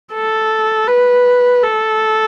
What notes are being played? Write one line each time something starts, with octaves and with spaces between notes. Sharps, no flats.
A4
B4
A4